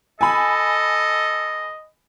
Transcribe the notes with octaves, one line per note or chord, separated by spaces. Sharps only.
A4 D#5 G#5 B5